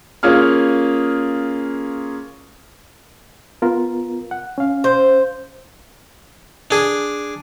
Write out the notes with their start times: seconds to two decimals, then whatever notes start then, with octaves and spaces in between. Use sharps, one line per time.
0.23 A#3 C#4 F4 G#4 F6
3.62 B3 F4 A#4
4.31 F#5
4.58 C#4 F5
4.84 C5
6.71 D4 G#4